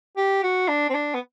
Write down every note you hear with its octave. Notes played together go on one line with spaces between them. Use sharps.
G4
F#4
D4
C4
D4
B3